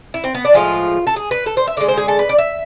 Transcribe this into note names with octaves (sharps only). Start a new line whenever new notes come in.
E4
C4
B3
D4
A2 F3 G#3 F4
A4
G#4
B4
A4
C5
E5
D3 G#3 D5
C5
G#4
A4
B4
D5
E5